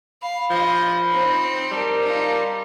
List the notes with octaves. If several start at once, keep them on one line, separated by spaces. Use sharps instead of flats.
F5 B5
F3 F4 D#5
C4 D#4
G3 A#4 A5 A#5
D#4 F4